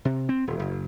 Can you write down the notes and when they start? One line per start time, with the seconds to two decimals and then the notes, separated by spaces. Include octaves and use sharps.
0.05 C3
0.29 C4
0.47 D#1
0.59 F#1